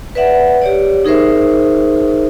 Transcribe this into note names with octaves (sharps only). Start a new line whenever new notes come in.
B4 D5 E5 F#5
G4 C#5 D5
D#4 G#4 A#4 C5 E5